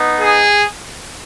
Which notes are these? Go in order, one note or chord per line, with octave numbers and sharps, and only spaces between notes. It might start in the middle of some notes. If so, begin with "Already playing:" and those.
Already playing: B3 D#4
G#4